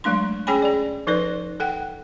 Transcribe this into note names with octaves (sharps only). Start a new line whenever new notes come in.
F#3 G#3 A3 D4 C6
C#4 G#4 C#5 G5 G#5 B5
G#4 D5
F3 D#4 A4 B4 D5
A4 F#5 G5